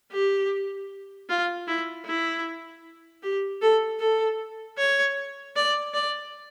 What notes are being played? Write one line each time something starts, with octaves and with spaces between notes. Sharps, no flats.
G4
F4
E4
E4
G4
A4
A4
C#5
D5
D5